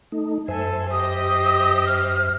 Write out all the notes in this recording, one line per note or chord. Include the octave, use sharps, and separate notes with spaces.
A3 D#4
F#2 A4 C5 E5 G#5
G4 D#5 D#6
F6